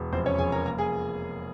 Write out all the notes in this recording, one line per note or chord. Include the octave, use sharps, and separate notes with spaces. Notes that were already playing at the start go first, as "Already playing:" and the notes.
Already playing: E1
F1 C4 C5
C#4 C#5
F1 G#4 G#5
A#4 A#5
A#3 A#4 A#5
G#4 G#5